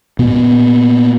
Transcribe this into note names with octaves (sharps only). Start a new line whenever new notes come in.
A#2 B3